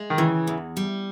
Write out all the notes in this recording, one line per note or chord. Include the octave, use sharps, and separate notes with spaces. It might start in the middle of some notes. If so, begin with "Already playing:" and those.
Already playing: G#3
D#3
C#3 E3
E2
G3